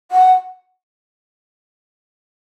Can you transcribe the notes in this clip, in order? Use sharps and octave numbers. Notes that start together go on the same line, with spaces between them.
F#5